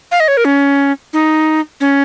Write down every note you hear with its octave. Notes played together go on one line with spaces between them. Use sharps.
F5
D#5
C#5
A#4
C#4
D#4
C#4